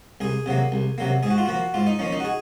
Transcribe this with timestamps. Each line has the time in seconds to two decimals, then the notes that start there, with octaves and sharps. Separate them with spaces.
0.21 C2 G#4
0.46 C3 F#3 A#3
0.72 C2
0.98 C3 F#3 A#3
1.23 G#2 G#4
1.30 F#4
1.38 F4
1.46 F3 A#3 F#4
1.74 G#2 F4
1.86 D#4
1.99 F3 A#3 C#4
2.12 D#4
2.20 F#4
2.25 G#4